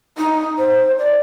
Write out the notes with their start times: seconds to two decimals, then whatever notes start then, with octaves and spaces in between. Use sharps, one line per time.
0.18 D#4
0.58 C5
0.99 D5